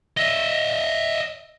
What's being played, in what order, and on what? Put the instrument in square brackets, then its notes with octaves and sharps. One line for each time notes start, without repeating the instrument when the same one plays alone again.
[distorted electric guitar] D#5 E5